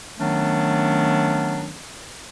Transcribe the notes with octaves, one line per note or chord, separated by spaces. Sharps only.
D#3 F#3 A3 B3 C#4 D4